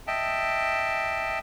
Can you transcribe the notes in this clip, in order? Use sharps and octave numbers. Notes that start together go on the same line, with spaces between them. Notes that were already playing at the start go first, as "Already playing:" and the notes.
D#5 E5 G5 A5